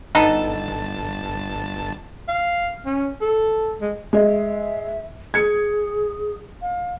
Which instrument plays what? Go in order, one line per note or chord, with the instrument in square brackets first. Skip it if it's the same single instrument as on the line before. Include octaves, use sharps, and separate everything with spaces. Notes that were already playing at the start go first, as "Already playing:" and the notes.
[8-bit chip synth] G1 A5 [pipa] B3 D#4 A4
[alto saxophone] F5
C#4
A4
G#3
[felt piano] G#3 D#5 [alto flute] E5
[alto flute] G#4 [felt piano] G#6 C#7
[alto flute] F5